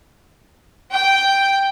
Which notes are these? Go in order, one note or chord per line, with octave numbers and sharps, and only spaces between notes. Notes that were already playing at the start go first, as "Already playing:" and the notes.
G5